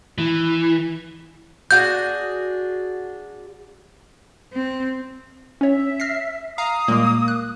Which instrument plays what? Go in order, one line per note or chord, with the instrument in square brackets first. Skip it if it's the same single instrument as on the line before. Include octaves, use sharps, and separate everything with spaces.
[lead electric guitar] E3
[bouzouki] D4 F#4 G#4 [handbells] G6
[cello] C4
[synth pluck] C#4 C#5 [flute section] E5
[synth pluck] F6 A#6 C7
[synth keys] F5 A#5 [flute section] D#6
[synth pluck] A#2 G3 G#3 [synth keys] A#3
[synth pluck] F#6